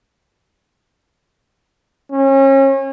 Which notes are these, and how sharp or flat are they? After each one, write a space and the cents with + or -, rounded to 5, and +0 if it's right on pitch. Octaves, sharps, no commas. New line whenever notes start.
C#4 -35